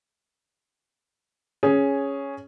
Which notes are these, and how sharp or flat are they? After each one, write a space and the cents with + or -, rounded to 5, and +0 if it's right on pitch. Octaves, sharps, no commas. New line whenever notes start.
C#4 +0 G#4 +0